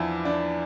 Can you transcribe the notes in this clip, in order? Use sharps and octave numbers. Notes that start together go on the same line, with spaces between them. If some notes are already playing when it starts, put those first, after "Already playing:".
Already playing: E2 F3 D4 E4
D4